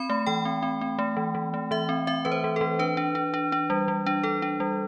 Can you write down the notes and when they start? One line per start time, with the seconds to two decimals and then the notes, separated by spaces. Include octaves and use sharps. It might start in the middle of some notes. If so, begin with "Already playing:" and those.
Already playing: C4 B5
0.10 A3
0.26 E3 G5
0.45 C4
0.63 C4
0.81 C4
0.99 A3
1.17 E3
1.35 E3
1.54 A3
1.71 E3 E5
1.89 C4
2.07 C4 E5
2.25 E3 B4
2.32 C5
2.44 E3
2.56 E3 A4
2.79 D4 B4
2.97 D4
3.15 D4
3.34 D4
3.52 D4
3.70 G3
3.88 G3
4.06 D4
4.24 D4 A4
4.42 D4
4.60 G3